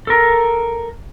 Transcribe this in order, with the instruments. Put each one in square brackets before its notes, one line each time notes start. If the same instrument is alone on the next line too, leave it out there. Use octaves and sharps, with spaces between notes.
[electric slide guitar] A4 A#4